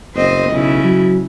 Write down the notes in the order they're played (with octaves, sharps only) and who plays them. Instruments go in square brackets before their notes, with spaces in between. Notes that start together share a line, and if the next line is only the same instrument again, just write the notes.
[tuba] F#1 [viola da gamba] C4 C5 D#5
[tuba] B1 [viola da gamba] C#3 E4
[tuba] F#3